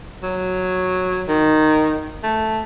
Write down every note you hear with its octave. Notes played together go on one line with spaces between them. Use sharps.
F#3
D#3
A3